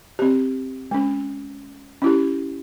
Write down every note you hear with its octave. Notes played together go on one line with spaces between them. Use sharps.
C4 G4
G#3 C#4
C#4 E4 G4